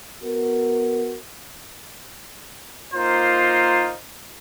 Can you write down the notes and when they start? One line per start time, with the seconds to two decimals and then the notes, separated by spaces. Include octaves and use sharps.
0.23 B3 F#4 A#4
2.94 A#3 D#4 F4 A#4 C5